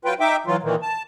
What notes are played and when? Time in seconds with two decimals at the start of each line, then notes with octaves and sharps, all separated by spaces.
0.05 F#3 F4 B4 G5
0.20 D#4 E5 G5 D6
0.47 E3 F#3 F4
0.63 A#2 D#3 E3
0.82 A5